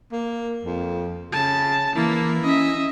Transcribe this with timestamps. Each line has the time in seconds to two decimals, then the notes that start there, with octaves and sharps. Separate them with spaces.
0.12 A#3
0.65 F2
1.33 C#3 A5
1.96 E3 A#3 E4
2.43 C#4 D#5 E5